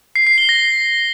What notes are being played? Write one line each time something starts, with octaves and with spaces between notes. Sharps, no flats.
C7
C7
G7
A#6